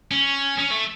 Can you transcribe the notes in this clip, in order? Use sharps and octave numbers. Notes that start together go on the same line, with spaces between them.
C#4
C#4
A3